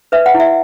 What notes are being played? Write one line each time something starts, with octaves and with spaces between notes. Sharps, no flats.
B4 E5
F#5
E4
E5